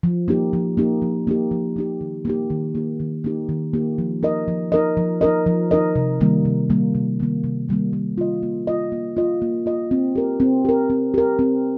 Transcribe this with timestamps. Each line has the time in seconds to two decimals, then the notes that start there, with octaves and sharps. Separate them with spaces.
0.03 F3
0.28 A#3 D#4 G4
0.53 F3
0.77 A#3 D#4 G4
1.02 F3
1.27 A#3 D#4 G4
1.51 F3
1.76 A#3 D#4 G4
2.01 D#3
2.25 A#3 D#4 G4
2.50 D#3
2.75 A#3 D#4 G4
3.00 D#3
3.24 A#3 D#4 G4
3.49 D#3
3.73 A#3 D#4 G4
3.98 F3
4.23 D#4 A#4 D#5
4.48 F3
4.72 D#4 A#4 D#5
4.97 F3
5.21 D#4 A#4 D#5
5.46 F3
5.71 D#4 A#4 D#5
5.96 C3
6.21 D#3 G3 A#3
6.45 C3
6.70 D#3 G3 A#3
6.95 C3
7.20 D#3 G3 A#3
7.44 C3
7.69 D#3 G3 A#3
7.93 A#3
8.18 F4 D#5
8.43 A#3
8.67 F4 D#5
8.92 A#3
9.17 F4 D#5
9.42 A#3
9.66 F4 D#5
9.91 C4
10.16 G4 A#4
10.40 C4
10.65 G4 A#4
10.90 C4
11.14 G4 A#4
11.39 C4